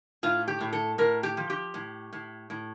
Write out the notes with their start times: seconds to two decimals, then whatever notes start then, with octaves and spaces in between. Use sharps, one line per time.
0.23 A2 F4
0.48 G4
0.60 A2
0.73 A4
0.98 A2 A#4
1.23 G4
1.37 F3
1.50 G4
1.74 A2
2.13 A2
2.50 A2